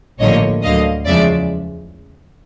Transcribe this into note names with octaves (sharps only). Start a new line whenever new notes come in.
A1 G2 D3 F3 A#3 C#5 D#5
D2 D3 F#3 D#5 F5
E2 C#3 F3 G#3 D5 E5